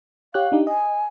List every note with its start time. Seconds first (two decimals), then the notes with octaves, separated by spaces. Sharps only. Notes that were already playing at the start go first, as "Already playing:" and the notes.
0.34 G4 C#5 F5 F#6
0.52 D4 D#4 G4
0.67 D#5 G#5